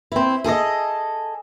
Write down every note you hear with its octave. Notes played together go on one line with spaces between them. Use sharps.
C4 E4
G#4 A4 D5 D#5